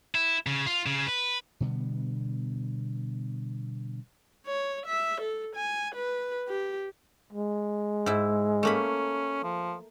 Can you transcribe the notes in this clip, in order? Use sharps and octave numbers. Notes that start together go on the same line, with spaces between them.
E4
C#3
F4
C#3
B4
B2 D3 G3 B3
C#5
E5
A4
G#5
B4
G4
G#3
G#2 E4
A3 A#3 C#4 B5
F3